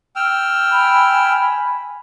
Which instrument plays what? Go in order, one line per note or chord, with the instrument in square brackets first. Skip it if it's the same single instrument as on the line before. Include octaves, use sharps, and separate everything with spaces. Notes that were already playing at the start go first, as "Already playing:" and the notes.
[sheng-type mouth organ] G5 E6 F6
[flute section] G#5 B5